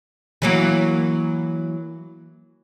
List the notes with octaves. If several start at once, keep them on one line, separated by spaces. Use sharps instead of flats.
E3 F#3 A#3